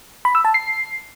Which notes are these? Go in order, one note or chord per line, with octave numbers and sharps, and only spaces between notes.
B5
E6
A5
C7